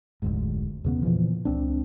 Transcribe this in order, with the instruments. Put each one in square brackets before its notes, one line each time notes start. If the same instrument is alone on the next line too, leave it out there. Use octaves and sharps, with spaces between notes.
[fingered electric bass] F1 D2 G#2
E2 C#3 B3
A#2 E3 F3
C#2 C4 D4